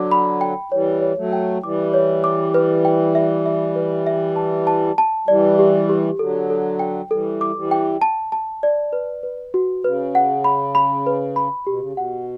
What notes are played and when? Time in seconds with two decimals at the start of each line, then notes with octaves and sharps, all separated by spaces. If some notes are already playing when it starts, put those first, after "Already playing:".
Already playing: D3 F#3 D6
0.11 B5
0.41 G5
0.72 E3 G3 C#5
1.02 C#5
1.17 F#3 A3
1.33 G5
1.63 E3 G3 D6
1.94 C#5
2.24 D6
2.54 B4
2.85 G5
3.15 E5
3.46 E5
3.76 B4
4.07 E5
4.36 A5
4.67 A5
4.98 A5
5.28 E3 G3 D5
5.59 G4
5.89 G4
6.19 D3 F#3 A4
6.50 A4
6.79 G5
7.10 E3 G3 A4
7.41 D6
7.56 E3 G3
7.71 G5
8.02 A5
8.32 A5
8.63 D5
8.93 B4
9.23 B4
9.54 F#4
9.84 C#3 B4
10.15 F#5
10.44 B5
10.75 B5
11.06 B4
11.36 B5
11.67 B2 G4
11.79 C#3
11.93 B2 F#5